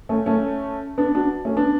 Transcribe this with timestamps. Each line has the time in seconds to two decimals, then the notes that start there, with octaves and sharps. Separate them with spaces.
0.09 A3 C#4
0.26 A3 C#4
0.98 B3 D4
1.15 D4 F#4
1.45 A3 C#4
1.57 B3 D4